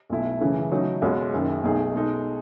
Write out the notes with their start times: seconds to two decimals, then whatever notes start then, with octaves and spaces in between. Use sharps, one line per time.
0.09 B1 B2 A3 E4
0.41 F#2 C#3 E3 A3
0.72 C#3 F#3 A3 D#4 F#4
1.02 C#2 B2 G#3 C#4 F#4
1.33 F#1 F#2 D#3
1.64 B1 B2 A3 D#4 G#4
1.94 B2 G#3 D#4 A4